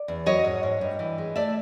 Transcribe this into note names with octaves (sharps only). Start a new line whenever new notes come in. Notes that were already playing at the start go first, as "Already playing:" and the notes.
Already playing: D5
E2
F#3 C#5 D#5
G#2
G#2
G2
E3
G#3
A3 D5 E5